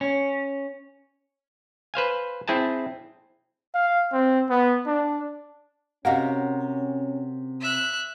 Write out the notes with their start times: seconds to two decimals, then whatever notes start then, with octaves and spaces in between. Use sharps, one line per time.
0.01 C#4
1.94 B4 C5 F5 G#5
2.48 C4 E4 G#4 G#5 A5
3.74 F5
4.12 C4
4.50 B3
4.86 D4
6.05 C3 C#4 F#4 A#4 D#5 F5 F#5
7.61 E5 F#6